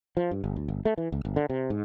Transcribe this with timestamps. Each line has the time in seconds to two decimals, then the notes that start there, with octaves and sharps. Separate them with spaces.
0.17 F3
0.31 G2
0.44 G1
0.56 D2
0.68 G1
0.85 A3
0.98 E3
1.12 C#2
1.25 G1
1.36 D3
1.50 C3
1.70 G#2